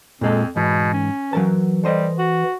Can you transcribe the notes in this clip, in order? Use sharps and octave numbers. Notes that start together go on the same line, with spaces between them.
F2 A#2 G#3 A4
G#2 B2 E3
C#4
E3 F#3 A#4 A5
G3 A4 C5 D#5
F#4